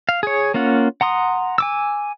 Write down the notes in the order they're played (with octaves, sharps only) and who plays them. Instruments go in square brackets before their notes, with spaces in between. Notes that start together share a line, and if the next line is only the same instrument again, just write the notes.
[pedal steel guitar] F5
G#4 C#5
A#3 C#4 F4 F#5
F#5 A#5 C6 D#6
G#5 D6 E6